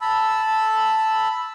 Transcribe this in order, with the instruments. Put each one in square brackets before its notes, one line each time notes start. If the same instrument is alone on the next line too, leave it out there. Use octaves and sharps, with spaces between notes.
[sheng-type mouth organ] A5 B5 E6